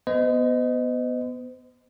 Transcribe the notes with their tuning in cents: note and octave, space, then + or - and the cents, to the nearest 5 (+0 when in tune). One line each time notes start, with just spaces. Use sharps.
B3 +0 C5 -45 D#5 +0